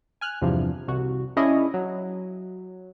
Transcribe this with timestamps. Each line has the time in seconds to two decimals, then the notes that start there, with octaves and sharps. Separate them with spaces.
0.21 G#5 F6 F#6
0.42 E2 G2 C3 F3
0.88 C2 F#4
1.37 C#4 D4 E4 G#4 C#5 D#5
1.74 F#3